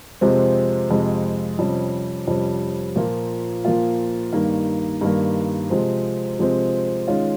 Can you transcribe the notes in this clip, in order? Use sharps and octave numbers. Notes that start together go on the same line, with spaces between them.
F2 C3 F3 G#3 C4
F2 C3 F3 G#3 C4
F2 C3 G3 C#4
F2 C3 G3 C#4
A#2 F3 A#3 F4
A#2 F3 A#3 F4
G2 D#3 A#3
G2 D#3 A#3
C3 F3 G#3 C4
C3 F3 G#3 C4
D#3 G#3 C#4 F4